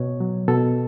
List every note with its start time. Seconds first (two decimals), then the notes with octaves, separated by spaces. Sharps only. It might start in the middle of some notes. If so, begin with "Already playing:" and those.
Already playing: B2 C#5
0.20 F#3
0.48 B2 A4